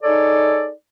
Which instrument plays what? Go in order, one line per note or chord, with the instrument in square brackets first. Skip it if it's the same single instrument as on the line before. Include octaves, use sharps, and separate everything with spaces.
[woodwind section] D#4 G#4 A4 C#5 D5